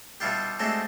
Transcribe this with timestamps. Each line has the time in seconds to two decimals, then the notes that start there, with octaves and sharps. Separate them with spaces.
0.20 B2 G3 D4 E4 F4 G4
0.60 G#3 A3 C4 D4 F#4 G4